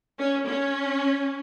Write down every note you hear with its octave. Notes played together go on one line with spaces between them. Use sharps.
C#4
C#4